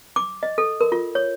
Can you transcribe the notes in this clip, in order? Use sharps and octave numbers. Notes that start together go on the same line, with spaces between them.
D6
D#5
A4
A#4
F4
C#5